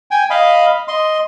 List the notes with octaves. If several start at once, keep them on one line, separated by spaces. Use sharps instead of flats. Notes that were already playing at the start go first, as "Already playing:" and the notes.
G5 G#5
D#5 F5 B5
D#5 C6